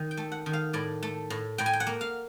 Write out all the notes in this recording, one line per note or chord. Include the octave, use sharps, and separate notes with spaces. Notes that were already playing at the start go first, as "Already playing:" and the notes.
Already playing: D#3
G5
A3
F#5
D#3
F5
A2 D5
A3
A2
A2 G5
G#5
G5
F#5
A#3
F5